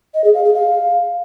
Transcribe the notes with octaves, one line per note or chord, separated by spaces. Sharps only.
D#5
G#4
F5
G#4
F5